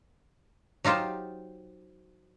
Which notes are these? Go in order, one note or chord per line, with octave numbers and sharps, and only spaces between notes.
F#3 D#4 F4 G4 C5